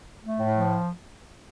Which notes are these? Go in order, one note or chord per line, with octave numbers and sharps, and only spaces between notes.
A3
A2
F3